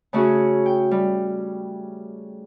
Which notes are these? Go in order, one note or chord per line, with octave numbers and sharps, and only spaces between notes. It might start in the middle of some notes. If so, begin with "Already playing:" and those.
C#3 A3 C#4 F#4 G#4
G5
G3